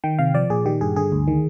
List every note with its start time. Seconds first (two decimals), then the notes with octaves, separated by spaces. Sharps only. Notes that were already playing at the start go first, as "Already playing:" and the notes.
0.04 D#3 G5
0.19 C3 F5
0.35 F3 D5
0.50 A#2 G#4
0.66 D#3 G4
0.81 G2 G#4
0.96 D3 G#4
1.12 D2
1.28 D#3